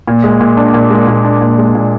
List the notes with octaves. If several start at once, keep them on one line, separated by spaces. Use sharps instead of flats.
A#2
G#3
A#2
D4
A#2
G#3
A#2
D4
A#2
G#3
A#2